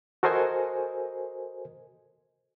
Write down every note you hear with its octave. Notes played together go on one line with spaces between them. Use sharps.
F#4 A4 A#4 C5 D#5 G#5